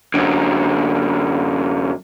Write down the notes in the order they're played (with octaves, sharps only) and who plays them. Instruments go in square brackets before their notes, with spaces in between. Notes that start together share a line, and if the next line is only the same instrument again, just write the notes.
[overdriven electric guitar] F#2 D3